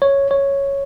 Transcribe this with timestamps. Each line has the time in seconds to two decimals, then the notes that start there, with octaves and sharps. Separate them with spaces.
0.02 C#5
0.31 C#5